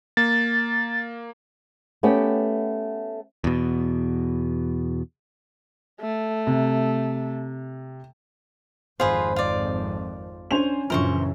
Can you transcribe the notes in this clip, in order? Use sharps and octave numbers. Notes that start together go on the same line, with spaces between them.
A#3 A6
A3 B3 C#4 G4
E2 B2
A3
C3
G#1 F2 F4 G#4 B4 C5
F4 D5
C#4 D4 C5 G#5 F7
A#1 F#2 C#3 E3 A#4 C5 C#6